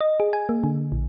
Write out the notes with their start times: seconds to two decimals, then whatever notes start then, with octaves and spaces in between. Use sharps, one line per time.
0.01 D#5
0.20 G#4
0.33 G#5
0.49 A#3
0.64 D3
0.92 A#1